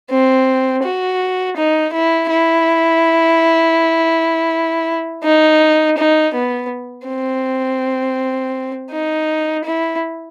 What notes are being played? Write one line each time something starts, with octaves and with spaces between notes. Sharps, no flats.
C4
F#4
D#4
E4
E4
D#4
D#4
B3
C4
D#4
E4